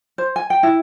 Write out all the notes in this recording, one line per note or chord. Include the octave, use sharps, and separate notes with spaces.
C5
G#5
G5
E4